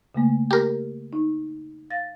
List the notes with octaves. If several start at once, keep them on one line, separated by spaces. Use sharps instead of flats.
C#3 A3 A#3
G4 A#4
D#4
F5 A6 A#6